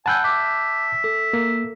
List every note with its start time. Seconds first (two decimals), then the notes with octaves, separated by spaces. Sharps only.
0.06 F#5 G#5 A5 B5 E6 F#6 G6
0.24 E5 D6
1.04 A4
1.33 A#3